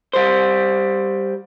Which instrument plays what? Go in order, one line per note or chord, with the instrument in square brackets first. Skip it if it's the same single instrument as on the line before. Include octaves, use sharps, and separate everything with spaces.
[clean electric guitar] G3 C5